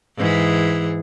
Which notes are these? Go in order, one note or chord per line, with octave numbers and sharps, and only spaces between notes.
G#2 E3 G#4